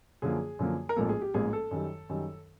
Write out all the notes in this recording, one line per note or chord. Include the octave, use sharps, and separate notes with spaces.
F#2 D3 F3 A#3 G#4
F#2 D3 F3 A#3
A#4
A1 G#2 F3 A#3 A4
G#4
G4
A1 G#2 F3 A#3 G#4
A4
F#2 D#3 G3
F#2 D#3 G3